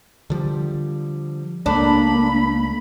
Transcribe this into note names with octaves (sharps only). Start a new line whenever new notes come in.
D3 F3 G3
C#2 A3 A#3 D4 B5